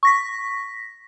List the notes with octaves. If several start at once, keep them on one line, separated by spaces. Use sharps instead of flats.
C#6 A#6 B6